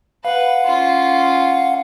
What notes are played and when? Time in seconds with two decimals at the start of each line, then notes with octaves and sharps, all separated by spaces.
0.25 B4 F5 F#5
0.65 C#4 F4